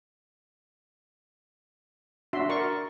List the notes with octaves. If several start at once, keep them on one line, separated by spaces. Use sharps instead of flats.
D4 F#4 E5 C6
A#4 D5 C6 C#6